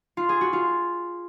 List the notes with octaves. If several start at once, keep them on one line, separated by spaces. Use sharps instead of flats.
F4
G#4
F#4
F4